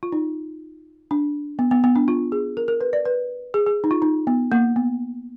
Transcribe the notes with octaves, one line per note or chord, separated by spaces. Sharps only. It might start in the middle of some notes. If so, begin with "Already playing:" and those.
F4
D#4
D4
B3
B3
B3
D4
F4
G#4
A#4
A#4
B4
D5
B4
G#4
G#4
D#4
F4
D#4
B3
A#3
B3